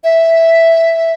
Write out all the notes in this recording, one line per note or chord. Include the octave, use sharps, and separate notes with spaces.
E5